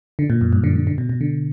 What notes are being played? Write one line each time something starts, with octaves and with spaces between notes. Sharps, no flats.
D3
A#2
F#2
G2
D3
D3
D3
B2
B2
D3